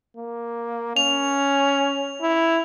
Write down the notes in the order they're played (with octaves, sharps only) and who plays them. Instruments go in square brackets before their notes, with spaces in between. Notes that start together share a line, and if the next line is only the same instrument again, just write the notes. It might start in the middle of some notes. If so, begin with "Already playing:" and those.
[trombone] A#3
[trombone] C#4 [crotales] F7
[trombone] E4